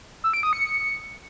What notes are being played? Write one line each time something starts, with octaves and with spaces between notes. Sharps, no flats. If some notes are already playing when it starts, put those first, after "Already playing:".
E6
D7
D#6
C#7